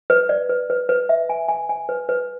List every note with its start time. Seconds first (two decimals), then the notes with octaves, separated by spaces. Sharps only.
0.10 B4
0.29 D5
0.49 B4
0.70 B4
0.89 B4
1.09 E5
1.29 G#5
1.49 G#5
1.69 G#5
1.89 B4
2.09 B4